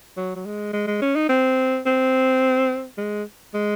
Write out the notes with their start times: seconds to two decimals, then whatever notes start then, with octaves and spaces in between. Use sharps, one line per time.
0.17 F#3
0.36 F#3
0.46 G#3
0.73 G#3
0.87 G#3
1.02 C#4
1.15 D#4
1.29 C4
1.86 C4
2.98 G#3
3.54 G#3